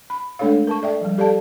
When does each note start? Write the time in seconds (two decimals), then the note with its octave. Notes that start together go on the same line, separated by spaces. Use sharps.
0.10 B5
0.39 G#3 A3 D4 A4 C#5 F5
0.67 A#4 A5 C#6
0.82 A4 D5 E5 G5
1.01 F3 G3
1.18 G4 A4 D5 F5 A5